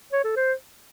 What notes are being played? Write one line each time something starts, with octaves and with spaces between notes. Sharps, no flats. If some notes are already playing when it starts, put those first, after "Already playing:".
C#5
A4
C5